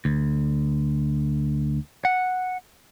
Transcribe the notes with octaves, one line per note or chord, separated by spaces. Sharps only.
D2
F#5